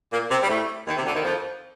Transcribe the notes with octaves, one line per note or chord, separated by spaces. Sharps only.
A#2 A#3
C3 C4
G3
A2 A3
D#2 D#3
C3
D2 D3
D#2 D#3
F2 F3